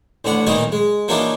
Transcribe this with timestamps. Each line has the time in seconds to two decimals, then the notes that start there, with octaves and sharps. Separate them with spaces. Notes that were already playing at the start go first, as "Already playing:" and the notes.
0.24 A1 D2 D4 F#5
0.47 B1 A#2 D#3 C4 D#4 D#5
0.72 G#3
1.08 E3 F#3 A#3 D4 D#4 F4